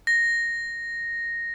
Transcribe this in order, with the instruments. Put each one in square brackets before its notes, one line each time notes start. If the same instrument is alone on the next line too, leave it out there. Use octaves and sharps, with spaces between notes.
[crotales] A#6